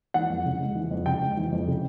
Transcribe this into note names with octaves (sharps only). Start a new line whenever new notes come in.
E3 F#5
F2
C#3
G#3
E3
F2
C#3 G5
G#3
E3
F2
C#3